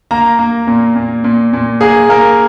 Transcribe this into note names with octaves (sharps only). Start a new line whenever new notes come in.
A#3 A#5
A#3
A#2
A#2
A#2
A#2
A#3 G#4
A#3 A#4